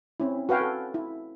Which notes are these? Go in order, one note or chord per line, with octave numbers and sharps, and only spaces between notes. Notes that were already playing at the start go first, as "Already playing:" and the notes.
C4 C#4 E4
F#4 B4 F5 G5 G#5
A4
E4